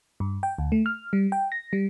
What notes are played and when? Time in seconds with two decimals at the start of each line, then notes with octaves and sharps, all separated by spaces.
0.20 G2
0.43 G5
0.58 D2
0.72 A3
0.86 F6
1.13 G3
1.32 G5
1.52 A#6
1.73 G3